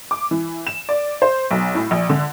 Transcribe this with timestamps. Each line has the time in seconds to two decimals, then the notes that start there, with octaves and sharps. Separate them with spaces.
0.11 D6
0.31 E3
0.67 E7
0.89 D5
1.22 C5
1.51 B1
1.75 A2
1.91 A#1
2.10 D3